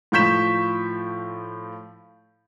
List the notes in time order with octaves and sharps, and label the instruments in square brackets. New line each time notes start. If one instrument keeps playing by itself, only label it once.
[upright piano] A2 F3 C#6 G6 B6 E7